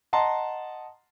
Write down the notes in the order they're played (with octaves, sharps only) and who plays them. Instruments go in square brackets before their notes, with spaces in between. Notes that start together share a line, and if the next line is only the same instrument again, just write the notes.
[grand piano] D#5 F#5 A5 A#5 C6